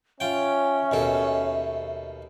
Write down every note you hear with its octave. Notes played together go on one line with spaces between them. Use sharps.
C#4 F4 E5 G5
D#2 B2 A4